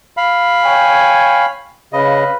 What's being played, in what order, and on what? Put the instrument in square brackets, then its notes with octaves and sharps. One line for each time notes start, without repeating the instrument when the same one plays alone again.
[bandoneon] F5 B5
[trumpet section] C#5 G5 G#5
[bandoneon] C#3 D#5 [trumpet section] B4 F5 B5